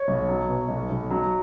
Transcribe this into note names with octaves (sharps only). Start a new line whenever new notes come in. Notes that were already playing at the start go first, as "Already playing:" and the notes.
Already playing: C#5
B1
F#3
B2
B1
B1
F#3